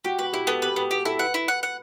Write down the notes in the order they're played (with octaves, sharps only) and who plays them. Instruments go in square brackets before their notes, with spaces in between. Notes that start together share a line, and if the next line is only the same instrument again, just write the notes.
[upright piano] F#4 [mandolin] G4
[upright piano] F#4 [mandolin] B4
[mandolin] E4 [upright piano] G4
[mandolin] B3 [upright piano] A4
[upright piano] G4 [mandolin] B4
[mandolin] B3 [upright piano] G4
[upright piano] F#4 [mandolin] G4
[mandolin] E4 [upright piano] A4
[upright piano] B4 [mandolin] F#5
[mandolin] E4
F#5
F#5